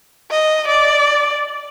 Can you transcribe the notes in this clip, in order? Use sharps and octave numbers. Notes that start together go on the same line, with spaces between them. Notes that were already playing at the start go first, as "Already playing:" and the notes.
D#5
D5